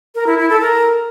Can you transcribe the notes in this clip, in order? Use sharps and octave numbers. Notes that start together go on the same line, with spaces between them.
A#4
E4
E4
A4
A#4